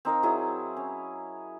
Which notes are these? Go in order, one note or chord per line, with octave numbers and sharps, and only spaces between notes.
C4 D#4 A#4 F5
F#3 E4 G#4
C#4